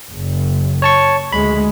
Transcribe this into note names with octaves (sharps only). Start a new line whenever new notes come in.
F#1
C#5 A5 C#6
D2 G#3 B5